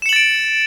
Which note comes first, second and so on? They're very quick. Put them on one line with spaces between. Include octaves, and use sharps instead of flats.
E7 C#7 F#7 A6 D7